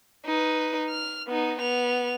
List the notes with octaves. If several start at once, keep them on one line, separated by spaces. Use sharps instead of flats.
D#4 B4
F6
B3 D#4
B3 F7